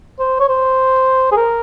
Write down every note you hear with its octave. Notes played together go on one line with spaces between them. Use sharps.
C5
C#5
C5
G#4
A#4